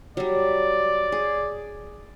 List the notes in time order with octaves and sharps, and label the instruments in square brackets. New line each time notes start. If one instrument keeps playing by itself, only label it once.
[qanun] F#3 G3 [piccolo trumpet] D5
[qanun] G#4